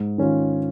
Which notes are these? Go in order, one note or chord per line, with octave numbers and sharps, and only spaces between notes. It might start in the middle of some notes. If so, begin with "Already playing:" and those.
Already playing: G#2
D#3 C#4 F4